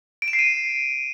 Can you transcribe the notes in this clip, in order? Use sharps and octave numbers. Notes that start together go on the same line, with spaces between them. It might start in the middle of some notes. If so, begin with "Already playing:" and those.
D7
E7
C7
D#7